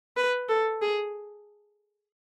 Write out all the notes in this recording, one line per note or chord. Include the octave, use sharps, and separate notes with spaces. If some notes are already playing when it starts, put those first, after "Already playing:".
B4
A4
G#4